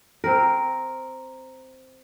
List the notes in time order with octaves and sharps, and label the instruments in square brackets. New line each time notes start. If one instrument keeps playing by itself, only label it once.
[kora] C4 A#4